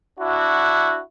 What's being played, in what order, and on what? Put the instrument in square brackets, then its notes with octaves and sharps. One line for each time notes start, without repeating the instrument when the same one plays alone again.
[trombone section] D4 E4 F#4